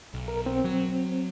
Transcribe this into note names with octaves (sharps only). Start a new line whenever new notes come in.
B1
A#4
C4
F#3